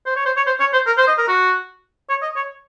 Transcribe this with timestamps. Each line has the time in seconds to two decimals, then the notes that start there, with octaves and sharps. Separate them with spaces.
0.06 C5
0.16 C#5
0.26 C5
0.36 C#5
0.46 C5
0.60 C#5
0.73 C5
0.86 A#4
0.98 C5
1.07 D#5
1.18 A#4
1.28 F#4
2.09 C#5
2.22 D#5
2.36 C#5